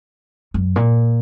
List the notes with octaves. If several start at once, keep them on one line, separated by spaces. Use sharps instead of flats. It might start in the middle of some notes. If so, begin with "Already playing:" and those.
F#2
A#2